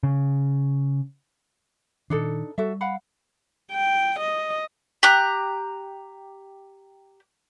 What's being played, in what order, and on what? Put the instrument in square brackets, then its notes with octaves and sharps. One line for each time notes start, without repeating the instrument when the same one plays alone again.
[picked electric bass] C#3
[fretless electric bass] A#2 D#3 [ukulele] D4 D#4 A4
[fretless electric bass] G3 [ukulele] F#4 A4 E5
[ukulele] F5 F#5 B5
[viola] G5
D#5
[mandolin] G4 A#5 F#6